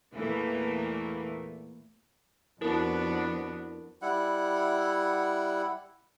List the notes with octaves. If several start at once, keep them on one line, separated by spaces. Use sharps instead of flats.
E2 A#2 E3 A3 A#3
F2 B3 D4 E4 F#4 A#4
G3 E4 F#5